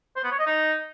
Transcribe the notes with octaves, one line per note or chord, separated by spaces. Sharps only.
C5
B3
C#5
D#5
D#4